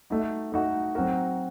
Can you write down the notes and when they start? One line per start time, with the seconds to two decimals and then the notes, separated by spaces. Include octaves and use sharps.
0.10 A3 D#4 F#4
0.52 A3 D#4 F#4
0.95 F#3 C4 F#4 A#4